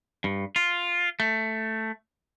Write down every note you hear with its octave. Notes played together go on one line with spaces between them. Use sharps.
G2
F4
A3